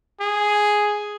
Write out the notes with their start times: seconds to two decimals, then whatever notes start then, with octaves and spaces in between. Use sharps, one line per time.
0.21 G#4